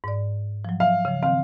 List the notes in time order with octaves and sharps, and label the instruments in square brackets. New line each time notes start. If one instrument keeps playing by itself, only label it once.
[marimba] G#2 D5
F3 F#3
[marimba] E5 [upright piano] F5
[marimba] C#3 F3
[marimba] D#3 C4 [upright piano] F5